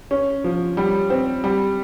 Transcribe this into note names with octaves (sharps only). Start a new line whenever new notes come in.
C#4
F3
G3
C4
G3